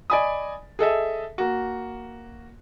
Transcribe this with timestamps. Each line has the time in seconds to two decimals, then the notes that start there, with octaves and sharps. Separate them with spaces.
0.10 D5 D#5 G#5 B5 D#6
0.79 G#4 A4 D#5 E5
1.38 A#3 F#4